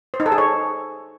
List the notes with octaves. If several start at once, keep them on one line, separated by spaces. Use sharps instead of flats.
C5
D#4
A4
G#4
C#5